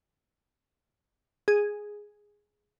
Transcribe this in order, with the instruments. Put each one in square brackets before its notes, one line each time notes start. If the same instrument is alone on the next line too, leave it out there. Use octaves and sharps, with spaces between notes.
[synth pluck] G#4